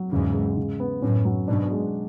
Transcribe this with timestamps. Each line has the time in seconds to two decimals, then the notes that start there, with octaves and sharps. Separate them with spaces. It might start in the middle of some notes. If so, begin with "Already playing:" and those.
Already playing: F#3
0.11 E2 G#2 C#3
0.34 G#3
0.57 C#3
0.80 B3
1.02 F#2 A2 C#4
1.25 F#3
1.48 G#2 B2 D4
1.71 G#3